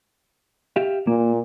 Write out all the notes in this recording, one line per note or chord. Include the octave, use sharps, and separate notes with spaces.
G4 E5 F5
A#2 A#3